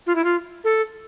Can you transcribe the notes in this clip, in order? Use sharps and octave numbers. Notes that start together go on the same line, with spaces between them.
F4
E4
F4
A4